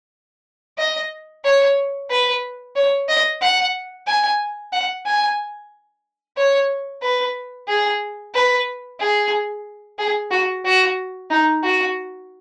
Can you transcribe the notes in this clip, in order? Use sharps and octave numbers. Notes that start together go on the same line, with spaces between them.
D#5
C#5
B4
C#5
D#5
F#5
G#5
F#5
G#5
C#5
B4
G#4
B4
G#4
G#4
F#4
F#4
D#4
F#4